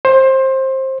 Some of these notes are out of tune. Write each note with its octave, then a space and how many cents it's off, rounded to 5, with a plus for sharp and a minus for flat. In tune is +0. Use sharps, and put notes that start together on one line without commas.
C5 +20